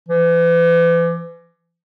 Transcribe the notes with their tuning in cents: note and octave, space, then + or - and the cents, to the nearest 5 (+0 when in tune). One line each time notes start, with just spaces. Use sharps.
E3 +40